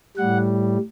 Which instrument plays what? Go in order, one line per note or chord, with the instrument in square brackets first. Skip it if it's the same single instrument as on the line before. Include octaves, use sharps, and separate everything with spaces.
[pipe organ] A2 G3 F#5